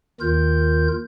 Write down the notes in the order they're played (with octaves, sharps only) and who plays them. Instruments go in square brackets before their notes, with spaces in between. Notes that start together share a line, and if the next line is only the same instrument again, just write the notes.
[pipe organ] D#2 D#3 F4 A#4 G6